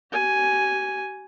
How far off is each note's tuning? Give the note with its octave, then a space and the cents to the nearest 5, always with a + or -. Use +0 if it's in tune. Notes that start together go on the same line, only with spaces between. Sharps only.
G4 -45 G#5 +0